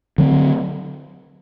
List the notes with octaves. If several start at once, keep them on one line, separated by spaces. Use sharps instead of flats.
D3 F#3 C4